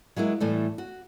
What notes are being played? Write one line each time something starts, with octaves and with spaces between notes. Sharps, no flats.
F#3 G#3 A#3 E4
A2 E3 G3 A3
F#4